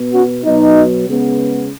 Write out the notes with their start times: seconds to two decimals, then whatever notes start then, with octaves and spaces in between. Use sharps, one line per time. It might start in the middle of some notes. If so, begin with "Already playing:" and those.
Already playing: B2 B3
0.12 C#4 F#4
0.44 B2 F#3 B3 D#4
1.07 C#3 G#3 B3